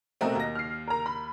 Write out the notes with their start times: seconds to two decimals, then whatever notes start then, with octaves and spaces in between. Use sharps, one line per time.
0.21 B2 A3 C4 F#4 A#4 D#5
0.35 D#2 A#6
0.55 F6 C7
0.87 A#4 A#5
1.06 B5